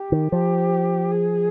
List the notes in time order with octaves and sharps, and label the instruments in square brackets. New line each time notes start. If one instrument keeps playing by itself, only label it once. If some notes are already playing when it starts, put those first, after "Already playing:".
Already playing: [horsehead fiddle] G4
[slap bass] D#3
[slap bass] F3 [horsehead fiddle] G4
[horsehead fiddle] G#4